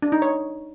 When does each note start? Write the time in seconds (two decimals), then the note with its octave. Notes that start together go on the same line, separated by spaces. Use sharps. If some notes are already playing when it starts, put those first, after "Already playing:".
0.02 D4
0.12 D#4
0.22 C#5